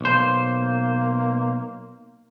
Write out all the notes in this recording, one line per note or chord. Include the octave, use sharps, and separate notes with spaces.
B1 A#3 C5